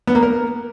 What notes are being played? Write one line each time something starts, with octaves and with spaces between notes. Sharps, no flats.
B3
A#3
A#4